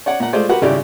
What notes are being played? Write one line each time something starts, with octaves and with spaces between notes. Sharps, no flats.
C#5 D5 F#5
A#2 F#5
G#3 A3 F4 C5 D5
F#4 G4 A#4 B4 F#5
G#1 C#3 G3 E4 G4 D5